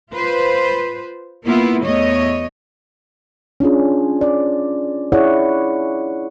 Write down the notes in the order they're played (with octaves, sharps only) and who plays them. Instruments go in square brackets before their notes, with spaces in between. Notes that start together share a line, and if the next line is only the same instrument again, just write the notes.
[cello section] F4 B4 C5
A#3 B3 E4 F4
E2 A3 C#5 D#5
[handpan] C#4 D4 F4 G#4
D5
E4 G#4 C#5 D5 F#5